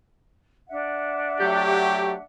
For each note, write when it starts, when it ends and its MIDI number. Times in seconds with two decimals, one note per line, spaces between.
0.69 2.21 62
0.69 2.21 76
0.69 2.21 78
1.40 2.15 54
1.40 2.15 57
1.40 2.15 67